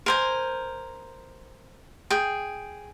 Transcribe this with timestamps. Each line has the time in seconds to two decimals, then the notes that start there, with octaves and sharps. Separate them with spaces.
0.06 A#4 C5 G#5
2.10 G#4 G5